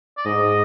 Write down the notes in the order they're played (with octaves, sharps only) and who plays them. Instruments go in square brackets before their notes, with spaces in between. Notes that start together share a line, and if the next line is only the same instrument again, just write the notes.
[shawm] D5
[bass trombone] G#2 [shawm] D#5